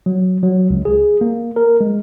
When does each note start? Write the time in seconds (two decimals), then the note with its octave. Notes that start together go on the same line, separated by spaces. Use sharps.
0.06 F#3
0.43 F#3
0.70 C#2
0.85 G#4
1.21 A#3
1.56 A#4
1.81 G#3